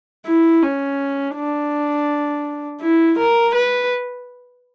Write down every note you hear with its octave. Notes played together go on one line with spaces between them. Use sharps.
E4
C#4
D4
E4
A#4
B4